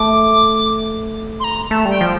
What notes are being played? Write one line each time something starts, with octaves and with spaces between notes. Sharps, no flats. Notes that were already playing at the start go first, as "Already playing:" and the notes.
Already playing: A3 D6
C6
A#5
A3 A5
G3
G5
F3